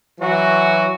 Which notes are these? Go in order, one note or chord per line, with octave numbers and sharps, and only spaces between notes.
E3 F#3 F#4